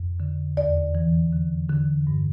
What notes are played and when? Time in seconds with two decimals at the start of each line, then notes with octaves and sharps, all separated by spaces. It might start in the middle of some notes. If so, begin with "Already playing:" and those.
Already playing: F2
0.20 D3
0.57 E2 D5
0.95 E3
1.33 D3
1.70 D3
2.07 G2